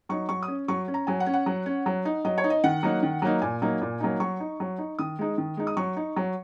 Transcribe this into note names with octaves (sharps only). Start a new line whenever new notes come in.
F#3 D#4 C#6
F#3 C#6
D#6
C#4
F#3 C#6
C#4
A#5
F#3 G#5
F#5
C#4
F#5
F#3
C#4
F#3
D#4
F#3 D#5
C#5
D#4
D#5
D#3 F#5
F#3 A#3 D#4
D#3
F#3 A#3 D#4
A#2 G#5
F#3 A#3 D#4
A#2
F#3 A#3 D#4
F#3 C#6
D#4
F#3
D#4
D#3 D#6
G#3 D#4
D#3
G#3 D#4
D#6
F#3 C#6
D#4
F#3